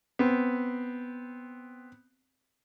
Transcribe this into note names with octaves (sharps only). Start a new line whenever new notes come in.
B3 C4